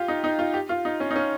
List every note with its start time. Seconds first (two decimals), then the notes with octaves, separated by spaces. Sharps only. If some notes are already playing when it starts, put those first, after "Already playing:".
Already playing: F4 G4
0.08 D#4
0.24 D#4
0.39 F4
0.54 G4
0.69 F4
0.85 D#4
1.00 C#4
1.11 D#4
1.16 C#4